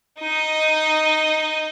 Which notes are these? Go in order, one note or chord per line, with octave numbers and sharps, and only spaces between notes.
D#4 D#5